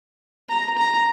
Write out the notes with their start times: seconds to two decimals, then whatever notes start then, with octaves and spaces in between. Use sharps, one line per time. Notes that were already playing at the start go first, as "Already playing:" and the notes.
0.49 A#5
0.77 A#5